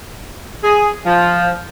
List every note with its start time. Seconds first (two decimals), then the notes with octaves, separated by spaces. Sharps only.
0.64 G#4
1.05 F3